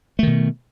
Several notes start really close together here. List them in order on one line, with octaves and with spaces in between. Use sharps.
A3 D#3 B2